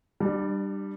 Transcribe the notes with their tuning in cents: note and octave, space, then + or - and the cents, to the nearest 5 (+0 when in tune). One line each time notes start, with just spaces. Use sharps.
G3 +0 D4 +30